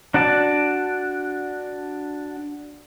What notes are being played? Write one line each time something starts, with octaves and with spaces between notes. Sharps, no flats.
D4 F#4 D5 A5